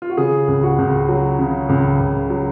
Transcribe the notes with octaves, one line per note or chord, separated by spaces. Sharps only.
F4
F#4
C#3 G#4
C#2
F#4
C#2
F#3
C#3
C#2
C#2
F#3